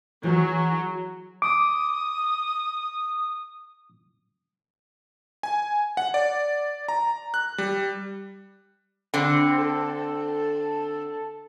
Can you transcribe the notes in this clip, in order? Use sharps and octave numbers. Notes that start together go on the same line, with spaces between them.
E3 F#3 G#4
D6 D#6
G#5
F#5
D5
A#5
F#6
G3
D3 C4
A4